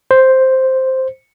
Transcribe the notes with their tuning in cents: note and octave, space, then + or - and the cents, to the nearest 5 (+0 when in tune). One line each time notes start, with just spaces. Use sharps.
C5 +0